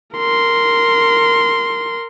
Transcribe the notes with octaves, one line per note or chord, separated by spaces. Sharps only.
A#4 C6